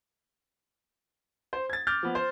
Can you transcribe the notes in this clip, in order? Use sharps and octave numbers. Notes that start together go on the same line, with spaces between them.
C5
G#6 A6
D6 F6 G6 A6
F3 B3
C5